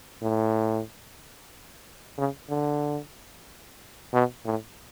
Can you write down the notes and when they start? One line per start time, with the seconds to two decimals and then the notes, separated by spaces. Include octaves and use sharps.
0.22 A2
2.18 C#3
2.50 D3
4.13 B2
4.45 A2